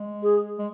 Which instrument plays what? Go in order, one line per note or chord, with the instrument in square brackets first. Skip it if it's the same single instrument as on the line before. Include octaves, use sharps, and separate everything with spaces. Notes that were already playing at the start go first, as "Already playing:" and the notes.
Already playing: [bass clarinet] G#3
[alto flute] G#4
[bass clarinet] G#3